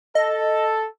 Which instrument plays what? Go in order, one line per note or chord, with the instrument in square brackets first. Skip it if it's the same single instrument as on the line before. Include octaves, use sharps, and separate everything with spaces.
[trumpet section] A4 [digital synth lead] D#5